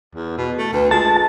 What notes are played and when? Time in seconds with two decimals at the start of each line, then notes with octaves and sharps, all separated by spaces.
0.15 E2
0.38 B2
0.58 A3
0.73 D2 B4
0.91 G#3 F4 A5